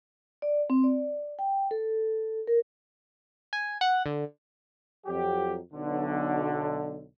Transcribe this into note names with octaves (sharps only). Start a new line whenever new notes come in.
D5
C4
D5
G5
A4
A#4
G#5
F#5
D3
F2 F#3 G4
B1 D3